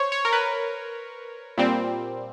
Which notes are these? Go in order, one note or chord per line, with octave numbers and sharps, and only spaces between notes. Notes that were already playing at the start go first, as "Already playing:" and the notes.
Already playing: C5 C#5
C#5
A#4
B4
A#2 G3 C4